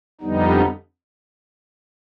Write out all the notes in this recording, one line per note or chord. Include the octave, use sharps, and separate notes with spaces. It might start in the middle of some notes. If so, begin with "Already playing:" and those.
F2 D3 G3 B3 D#4